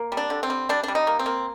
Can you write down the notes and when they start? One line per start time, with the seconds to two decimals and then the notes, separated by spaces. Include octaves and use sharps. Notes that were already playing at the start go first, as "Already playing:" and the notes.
Already playing: A#3
0.12 G3
0.17 D4
0.30 D3
0.43 C4
0.50 G3
0.69 G3 D4
0.83 G3 D4
0.95 D#4
1.07 A#3
1.19 C4
1.26 A#3